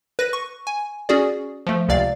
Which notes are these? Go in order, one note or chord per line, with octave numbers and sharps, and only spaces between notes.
B4 A#6 D#7
C#6
G#5
C#4 F#4 G#4 D5
F3 A3
C#2 C3 D5 F5 A6